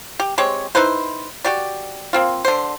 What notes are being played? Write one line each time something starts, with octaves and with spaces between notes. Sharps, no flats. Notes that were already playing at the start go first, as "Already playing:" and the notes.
G4
G#3 C4 G4 C#5
D#4 E4 B4 C5
F#4 G4 D5
A#3 C4 F4
D3 C5